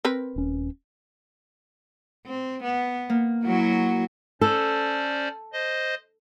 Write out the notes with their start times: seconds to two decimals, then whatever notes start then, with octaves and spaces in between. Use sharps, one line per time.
0.05 C4 A#4 B4
0.36 D#1 C#4
2.26 C4
2.64 B3
3.10 A#3
3.44 F#3 E4 F#4
4.41 C#4 A4 C5 D5
5.53 C5 D#5